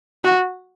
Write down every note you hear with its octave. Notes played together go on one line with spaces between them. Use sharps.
F#4